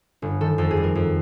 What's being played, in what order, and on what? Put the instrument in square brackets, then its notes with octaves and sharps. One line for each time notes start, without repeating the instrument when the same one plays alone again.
[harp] G1
D#3 A4
F2 A4
G#4
G3
A#4
F2